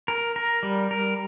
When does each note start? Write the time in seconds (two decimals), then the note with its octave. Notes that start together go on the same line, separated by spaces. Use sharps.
0.08 A#4
0.36 A#4
0.63 G3
0.91 A#4